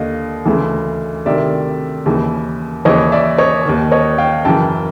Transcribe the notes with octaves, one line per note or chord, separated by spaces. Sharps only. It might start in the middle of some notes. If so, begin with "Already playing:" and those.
Already playing: D#2 D3 D#5 F5
D2 C#3 E3
D2 C3 D#3 D5 E5
D#2 C#3 E3
D#2 C#3 E3 C#5 D#5
D5 E5
C#5 D#5
D#2 D#3
C#5 D#5
F5 G5
F#2 C#3 E3 G5 A5